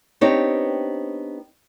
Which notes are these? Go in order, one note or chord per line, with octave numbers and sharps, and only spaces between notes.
B3 C4 D4 D#4 G4 C#5